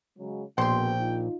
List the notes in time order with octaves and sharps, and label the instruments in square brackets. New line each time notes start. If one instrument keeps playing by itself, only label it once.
[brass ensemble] C#3 F#3 G#3
[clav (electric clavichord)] A#1 [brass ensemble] B2 [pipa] C5 C6 [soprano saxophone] G5
[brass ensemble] D#4 F4